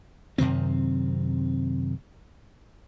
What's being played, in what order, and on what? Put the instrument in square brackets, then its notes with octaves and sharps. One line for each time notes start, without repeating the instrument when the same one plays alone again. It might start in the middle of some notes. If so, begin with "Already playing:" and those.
[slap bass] F#2 C3 D#3 C4